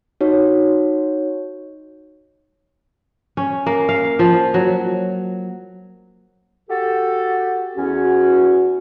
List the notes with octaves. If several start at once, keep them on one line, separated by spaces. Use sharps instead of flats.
D#4 F#4 C#5
C#4
A#3
F5
F3
F#3
F#4 G4 A4
E2 C#4 F#4